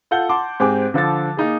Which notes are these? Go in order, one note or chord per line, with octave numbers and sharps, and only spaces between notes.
F4 A4 F#5 G6 G7
F#5 A5 C6 D6
G#2 C4 G4 G5 G#5 D6
D3 F3 A4 A6
A#3 D#4 G#4